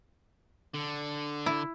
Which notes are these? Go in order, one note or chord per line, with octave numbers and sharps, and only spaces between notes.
D3
E4